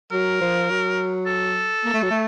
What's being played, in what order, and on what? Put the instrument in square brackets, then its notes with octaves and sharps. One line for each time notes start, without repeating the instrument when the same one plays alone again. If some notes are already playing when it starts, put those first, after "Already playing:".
[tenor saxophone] F#3 [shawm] A#4
[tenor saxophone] F3
F#3
[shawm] A4
[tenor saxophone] A#3
A3
F#3
A3